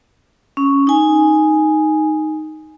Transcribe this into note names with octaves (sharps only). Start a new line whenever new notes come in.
C#4
D#4 G#5